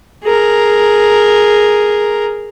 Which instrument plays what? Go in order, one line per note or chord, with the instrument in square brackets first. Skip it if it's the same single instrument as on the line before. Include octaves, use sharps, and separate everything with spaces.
[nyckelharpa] G#4 A#4